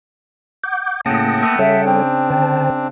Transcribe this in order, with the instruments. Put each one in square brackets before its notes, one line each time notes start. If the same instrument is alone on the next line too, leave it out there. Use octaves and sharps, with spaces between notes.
[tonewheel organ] F#5 D6 G6
[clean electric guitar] A2 C#3 [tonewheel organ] A#3 D#6 A#6 [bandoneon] F#5 G5 A5
[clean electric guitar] A3 B3
[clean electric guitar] C#3 [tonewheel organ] G3 A4 C#5 [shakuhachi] E5
[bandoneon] C4 D4 [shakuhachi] G5
[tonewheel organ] D3 C5 A5